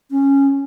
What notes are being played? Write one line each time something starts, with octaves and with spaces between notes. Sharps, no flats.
C#4